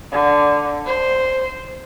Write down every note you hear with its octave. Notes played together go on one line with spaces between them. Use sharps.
D3
C5